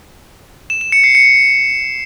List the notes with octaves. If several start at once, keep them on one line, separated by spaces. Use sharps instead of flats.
E7
E7
C#7
C7
C#7